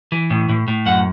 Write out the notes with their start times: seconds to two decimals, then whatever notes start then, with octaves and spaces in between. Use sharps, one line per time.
0.12 E3
0.30 A2
0.49 A2
0.68 A2
0.86 F#2 F#5